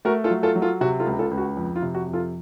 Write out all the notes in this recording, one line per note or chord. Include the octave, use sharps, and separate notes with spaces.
A3 F#4 A#4
F4 A4
F#3
F4 A4
F#3
F4 A4
C3 F#4
F4 A4
C#2
F4 A4
C#2
F#4
F2
F4
C3
F#4
F2
F4 A4